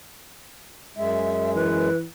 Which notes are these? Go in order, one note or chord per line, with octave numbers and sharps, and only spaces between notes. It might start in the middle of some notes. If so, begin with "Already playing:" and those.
F#2 G#3 E5
E3 B4